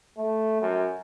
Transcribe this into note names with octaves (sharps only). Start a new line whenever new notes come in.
A3
F#2